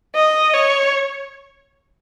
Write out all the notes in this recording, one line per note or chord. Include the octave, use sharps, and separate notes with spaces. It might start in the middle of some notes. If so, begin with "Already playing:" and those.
D#5
C#5